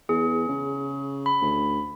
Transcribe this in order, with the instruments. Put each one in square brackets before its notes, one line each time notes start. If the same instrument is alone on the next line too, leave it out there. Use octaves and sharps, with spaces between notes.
[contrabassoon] E2 [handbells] G#4
[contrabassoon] C#3
[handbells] B5
[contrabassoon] D2